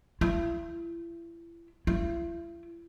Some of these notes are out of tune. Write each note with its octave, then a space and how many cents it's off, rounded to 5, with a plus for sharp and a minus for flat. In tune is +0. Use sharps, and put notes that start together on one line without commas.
E4 +35
E4 +40